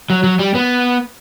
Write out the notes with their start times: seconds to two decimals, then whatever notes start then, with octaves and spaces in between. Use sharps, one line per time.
0.10 F#3
0.24 F#3
0.39 G3
0.55 B3